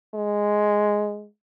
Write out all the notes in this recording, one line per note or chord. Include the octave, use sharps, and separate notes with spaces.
G#3